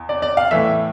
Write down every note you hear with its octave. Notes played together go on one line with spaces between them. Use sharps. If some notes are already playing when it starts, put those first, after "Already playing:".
Already playing: E2
D5
D5
F5
A2 E3 A3 E5